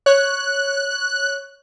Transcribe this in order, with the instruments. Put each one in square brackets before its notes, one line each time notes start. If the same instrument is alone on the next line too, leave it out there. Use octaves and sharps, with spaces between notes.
[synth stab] C#5 [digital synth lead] F#6